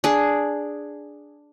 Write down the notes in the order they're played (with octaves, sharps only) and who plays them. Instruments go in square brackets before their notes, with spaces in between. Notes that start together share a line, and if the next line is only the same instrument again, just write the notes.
[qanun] D4 G#4